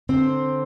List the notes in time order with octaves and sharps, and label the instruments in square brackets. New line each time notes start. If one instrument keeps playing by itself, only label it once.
[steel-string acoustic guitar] D3 C4 C5